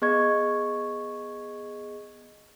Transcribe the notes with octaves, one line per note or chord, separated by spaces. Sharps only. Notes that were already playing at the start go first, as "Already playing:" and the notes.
B3 G#4 D#5 C#6 G#6